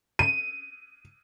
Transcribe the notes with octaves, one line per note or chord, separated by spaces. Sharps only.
D#7